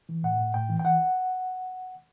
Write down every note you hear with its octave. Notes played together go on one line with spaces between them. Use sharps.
E3
A2 F#5
A2
A2 G5
E3
G5
E3 F#5